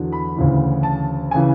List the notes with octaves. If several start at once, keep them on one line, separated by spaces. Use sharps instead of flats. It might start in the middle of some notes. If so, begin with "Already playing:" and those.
Already playing: E2 D3 F#3
B5
D2 C#3 E3
A5
G#5
C#3 E3